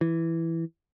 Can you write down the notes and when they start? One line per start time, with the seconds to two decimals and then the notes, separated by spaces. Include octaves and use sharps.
0.01 E3